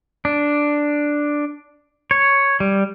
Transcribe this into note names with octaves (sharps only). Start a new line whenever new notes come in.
D4
C#5
G3